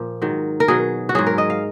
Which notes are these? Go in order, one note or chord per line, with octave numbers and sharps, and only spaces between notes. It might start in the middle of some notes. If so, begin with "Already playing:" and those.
Already playing: A#2 F3
G#2 D#3 F#3
A#4
B2 F#3 G#4
F#4
G#2 F#3 G#4
A#4
D#5
F5